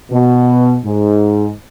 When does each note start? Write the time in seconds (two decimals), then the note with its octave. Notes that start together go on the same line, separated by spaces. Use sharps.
0.11 B2
0.84 G#2